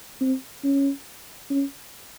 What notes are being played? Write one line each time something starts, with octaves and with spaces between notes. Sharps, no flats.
C4
C#4
C#4